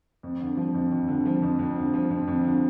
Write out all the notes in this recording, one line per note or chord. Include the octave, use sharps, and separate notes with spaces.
F2
D3
F3
F2
F2
D3
F3
F2
F2
D3
F3
F2
F2
D3